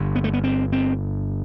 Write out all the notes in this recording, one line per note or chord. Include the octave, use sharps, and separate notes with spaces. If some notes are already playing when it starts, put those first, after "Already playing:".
Already playing: G1 G2 D3
B3
A3
B3
C4
C4